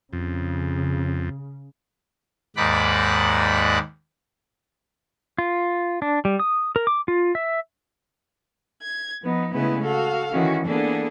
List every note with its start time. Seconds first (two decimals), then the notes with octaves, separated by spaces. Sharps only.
0.13 F2 C#3
2.56 D#2 G#2 D5 F#5 B5
5.38 F4
6.02 D4
6.25 G3
6.39 D#6
6.76 A#4
6.87 D6
7.08 F4
7.35 E5
8.82 G#6
9.22 F3 B3 D#4
9.53 C#3 G#3 A3 B3 E4 B4
9.83 F#4 A4 F5
10.31 D#3 E3 C#4 F#4
10.66 E3 A#3 B3 D4 G#4 A4